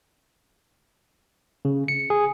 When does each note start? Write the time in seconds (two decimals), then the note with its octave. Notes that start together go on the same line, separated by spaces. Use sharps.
1.65 C#3
1.88 C#7
2.10 G#4